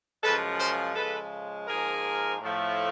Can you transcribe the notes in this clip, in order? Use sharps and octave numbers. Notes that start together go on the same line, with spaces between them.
F#2 C#3 F3 G#3 A4 B4
A#4 C5
C#3 F3 G#3 A4 B4
G#2 F3 A#3 G#4 A#4
A2 F3 A3